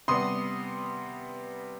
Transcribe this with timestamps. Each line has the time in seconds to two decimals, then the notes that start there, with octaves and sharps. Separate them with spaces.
0.08 C3 G3 B3 C6 D#6